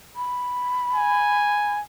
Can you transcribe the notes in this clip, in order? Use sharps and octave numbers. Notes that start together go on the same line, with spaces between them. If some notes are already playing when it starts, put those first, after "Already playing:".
B5
G#5